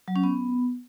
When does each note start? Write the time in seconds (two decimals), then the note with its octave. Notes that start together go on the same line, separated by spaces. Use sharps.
0.08 F#3
0.16 C#4
0.24 B3